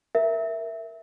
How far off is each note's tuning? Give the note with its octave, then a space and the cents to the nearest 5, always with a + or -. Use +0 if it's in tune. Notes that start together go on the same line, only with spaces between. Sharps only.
A#4 +0 E5 +0